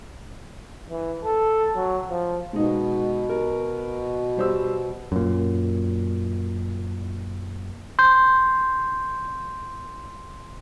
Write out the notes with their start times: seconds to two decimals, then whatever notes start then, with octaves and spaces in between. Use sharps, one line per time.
0.91 E3
1.25 A4
1.76 F#3
2.10 F3
2.53 B2 G#3 D#4
3.29 A#4
4.37 G3 C5 E6
5.12 F#2 A#2
7.99 C6 G6